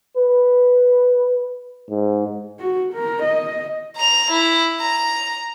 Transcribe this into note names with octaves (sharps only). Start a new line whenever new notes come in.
B4
G#2
F#4
A#4
D#5
A#5 F7
E4
A#5